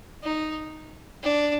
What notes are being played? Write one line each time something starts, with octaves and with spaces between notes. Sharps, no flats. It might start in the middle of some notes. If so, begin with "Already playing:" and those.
D#4
D4